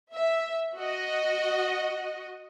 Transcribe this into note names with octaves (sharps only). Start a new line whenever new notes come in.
E5
F#4 D#5